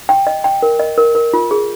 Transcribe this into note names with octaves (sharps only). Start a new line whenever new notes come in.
G5
D#5
G5
A#4
D#5
A#4
A#4
F4
G#4